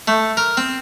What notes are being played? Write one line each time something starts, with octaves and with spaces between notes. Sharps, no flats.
A3
A#4
C4